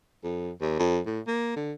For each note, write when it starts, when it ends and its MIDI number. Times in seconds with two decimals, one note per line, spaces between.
0.24 0.51 41
0.61 0.76 39
0.79 0.99 41
1.06 1.20 45
1.27 1.52 58
1.56 1.73 50